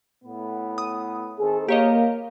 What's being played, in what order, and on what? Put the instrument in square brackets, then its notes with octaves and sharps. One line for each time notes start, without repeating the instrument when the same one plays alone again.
[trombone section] A2 B3
[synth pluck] D#6
[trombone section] D#3 C4 A4 [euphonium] G#4
[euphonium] A#3 [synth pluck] G4 C#5 D#5 [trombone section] A#4